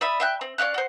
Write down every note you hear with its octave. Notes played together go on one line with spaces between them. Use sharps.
D5 E5 B5 D#6
E5 G5 F#6
C4
C#4 D5 F5 F#6
F#4 C5